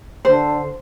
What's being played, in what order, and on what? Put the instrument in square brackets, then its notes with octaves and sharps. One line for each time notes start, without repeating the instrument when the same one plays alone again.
[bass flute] D3 [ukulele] C5